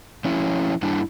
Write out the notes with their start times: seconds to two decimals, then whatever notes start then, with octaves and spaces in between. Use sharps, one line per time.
0.25 F3 C#4 E4
0.82 G2 G3 D4 E4